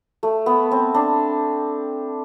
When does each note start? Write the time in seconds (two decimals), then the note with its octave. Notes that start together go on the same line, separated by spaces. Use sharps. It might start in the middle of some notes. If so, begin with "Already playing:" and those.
0.23 A3
0.46 B3
0.71 C4
0.95 D4